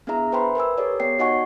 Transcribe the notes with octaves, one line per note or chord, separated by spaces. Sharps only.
B3 D4 E4 G#4 E5 A#5
B4 C5 E5 G5 B5 C6
A#4 B4 G#5 E6
G4 A4 A#4 C#5 D5
B3 C#5 D5 G5 C7
D#4 F#4 D#5 F#5 G#5 C#6